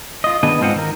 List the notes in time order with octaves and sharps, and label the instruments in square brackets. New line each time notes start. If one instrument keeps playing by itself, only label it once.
[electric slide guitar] F4 D#5
D#3 B3 D4 G#4 D#5
G#2 C4 F4 C5 D#5 F#5
D#3 A#4